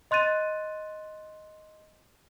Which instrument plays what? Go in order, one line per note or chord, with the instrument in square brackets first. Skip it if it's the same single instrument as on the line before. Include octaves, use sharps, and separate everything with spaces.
[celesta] D#5 C6 F#6 A6 D#7